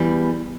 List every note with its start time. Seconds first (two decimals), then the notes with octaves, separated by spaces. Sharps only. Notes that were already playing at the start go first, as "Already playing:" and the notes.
Already playing: E2 E3 G3